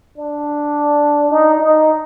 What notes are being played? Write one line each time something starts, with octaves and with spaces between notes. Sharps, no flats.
D4
D#4
D#4